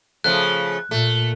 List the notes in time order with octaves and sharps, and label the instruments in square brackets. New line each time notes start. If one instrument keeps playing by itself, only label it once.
[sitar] C#3 F3 A3 [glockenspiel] F#6
[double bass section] A#2 [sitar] A3